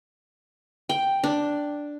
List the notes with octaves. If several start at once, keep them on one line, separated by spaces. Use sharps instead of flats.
G5
D4